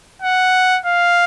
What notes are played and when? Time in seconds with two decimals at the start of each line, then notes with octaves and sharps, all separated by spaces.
0.22 F#5
0.86 F5